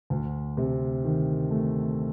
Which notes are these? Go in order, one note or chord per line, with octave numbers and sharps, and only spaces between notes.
D2
C3
D#3
A3